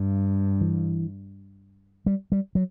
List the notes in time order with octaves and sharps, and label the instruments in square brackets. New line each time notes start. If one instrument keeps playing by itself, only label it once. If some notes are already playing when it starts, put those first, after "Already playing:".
Already playing: [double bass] G2
[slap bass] E3
G3
G3
F#3